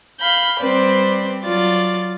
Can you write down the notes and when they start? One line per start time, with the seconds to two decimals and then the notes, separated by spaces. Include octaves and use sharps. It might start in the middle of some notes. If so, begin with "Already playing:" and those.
0.19 F5 B5 G6
0.59 G3 C4 B4 C5 D5
1.42 F#3 F4 D5 A6